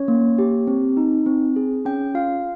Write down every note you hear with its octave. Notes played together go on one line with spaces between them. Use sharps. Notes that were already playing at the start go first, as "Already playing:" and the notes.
Already playing: C#4 C#5
A#3
G4
C4
D#4
C4
G#4
C#4 G5
F4 F5